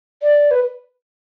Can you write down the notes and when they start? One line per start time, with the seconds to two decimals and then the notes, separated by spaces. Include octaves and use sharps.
0.22 D5
0.51 B4